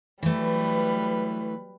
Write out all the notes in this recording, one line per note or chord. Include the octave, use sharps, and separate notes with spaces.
E3 F#3 G3 A3 B4